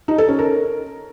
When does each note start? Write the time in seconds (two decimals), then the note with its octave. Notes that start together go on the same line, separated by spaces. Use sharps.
0.08 D#4
0.18 A4
0.29 C#4
0.39 A#4